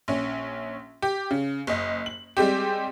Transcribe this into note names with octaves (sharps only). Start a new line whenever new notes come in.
A#1 C#4
G4
C#3
F#1 D#5
F#7
G3 G#3 C4 G4